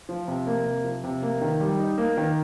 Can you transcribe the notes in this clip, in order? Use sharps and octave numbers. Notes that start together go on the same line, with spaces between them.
F3
C3
A#3
C3
F3
C3
A#3
D#3
G3
D#4
A#3
D#3